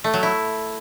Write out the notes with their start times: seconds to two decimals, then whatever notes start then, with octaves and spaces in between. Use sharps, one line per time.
0.04 A3
0.14 F#3
0.23 E4